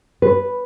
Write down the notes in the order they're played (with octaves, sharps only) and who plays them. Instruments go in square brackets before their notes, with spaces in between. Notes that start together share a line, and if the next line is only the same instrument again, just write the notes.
[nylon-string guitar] B4